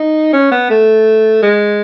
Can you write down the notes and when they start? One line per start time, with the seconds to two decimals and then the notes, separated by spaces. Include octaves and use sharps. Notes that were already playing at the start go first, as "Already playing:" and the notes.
Already playing: D#4
0.33 C#4
0.51 B3
0.70 A3
1.42 G#3